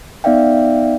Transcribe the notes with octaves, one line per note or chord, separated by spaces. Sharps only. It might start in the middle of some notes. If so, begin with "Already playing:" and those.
B3 D#4 D5 E5 F5 G5